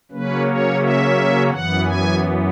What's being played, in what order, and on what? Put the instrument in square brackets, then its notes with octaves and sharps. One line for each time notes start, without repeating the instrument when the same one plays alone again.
[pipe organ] C#3 F#3 A#3 C#4 B4
C#5
E5
F#2 E3 B3 F#5
G#5